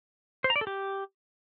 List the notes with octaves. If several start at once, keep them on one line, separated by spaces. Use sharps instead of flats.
C5
A#5
D5
A4
G4